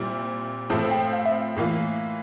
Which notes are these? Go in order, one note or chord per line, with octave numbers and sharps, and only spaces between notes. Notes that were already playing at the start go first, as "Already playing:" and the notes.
Already playing: A#2 G3 C4 E4
A2 F3 A3 C4 A5
G5
F5
E5
F5
A2 E3 A#3 F4